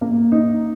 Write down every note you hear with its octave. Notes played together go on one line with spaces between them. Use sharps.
A#3
D#4